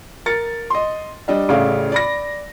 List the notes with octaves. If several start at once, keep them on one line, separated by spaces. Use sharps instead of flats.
A#4 A6 C#7
D#5 C6
G3 D4 D#5
A1 C#3 A3 D5 F5
D5 B5 A#6